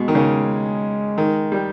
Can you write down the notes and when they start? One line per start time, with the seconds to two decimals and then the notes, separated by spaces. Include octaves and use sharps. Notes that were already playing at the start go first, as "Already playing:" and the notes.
Already playing: B2 G#3
0.08 D#3
0.15 C#3
1.18 D#3
1.52 G3